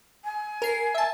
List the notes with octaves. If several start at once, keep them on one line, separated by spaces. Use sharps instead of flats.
G#5
A#4 C7
E5 A5